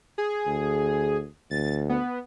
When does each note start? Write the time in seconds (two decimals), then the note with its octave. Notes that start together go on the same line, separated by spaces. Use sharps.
0.18 G#4
0.46 D2
1.51 D2 A6
1.89 B3